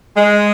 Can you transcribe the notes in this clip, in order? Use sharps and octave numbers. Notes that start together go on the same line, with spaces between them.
G#3